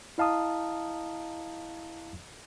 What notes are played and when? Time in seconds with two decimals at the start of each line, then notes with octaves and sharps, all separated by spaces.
0.18 E4 D#5 F5 A5 A#5 D#6